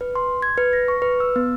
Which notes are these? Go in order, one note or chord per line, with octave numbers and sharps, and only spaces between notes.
B4
C6
G#6
B4
A#6
C#6
B4
E6
B3